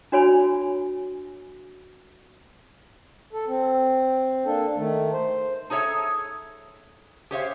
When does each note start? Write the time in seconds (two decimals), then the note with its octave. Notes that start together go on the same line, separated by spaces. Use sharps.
0.12 D4 F#4 C#5 G#5 B5
3.33 A4
3.47 C4
4.46 A#3 D4 A4
4.76 D#3 A3
5.13 C5
5.70 D#4 G#4 A4 C#5 E5
7.31 G4 G#4 C5 C#5 E5 F5